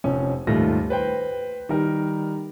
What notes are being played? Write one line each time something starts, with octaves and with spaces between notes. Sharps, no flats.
F1 F2 C#4
D#2 G#2 G3 A3 F4 A#6
B4 C5 G5
D#3 G3 A#4